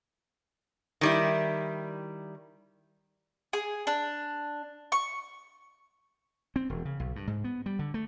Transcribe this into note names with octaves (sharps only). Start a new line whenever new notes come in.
D#3 G3 E4
G#4
D4
C#6
C4
E1
C#3
B1
G2
G#2
B3
G3
D3
A3